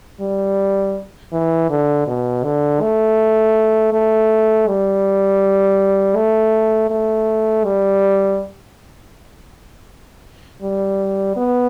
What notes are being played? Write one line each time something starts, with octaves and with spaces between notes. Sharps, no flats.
G3
E3
D3
B2
D3
A3
A3
G3
A3
A3
G3
G3
B3